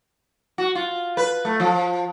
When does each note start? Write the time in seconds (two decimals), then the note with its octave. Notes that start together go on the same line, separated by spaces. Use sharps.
0.58 F#4
0.75 F4
1.17 B4
1.45 A3
1.60 F3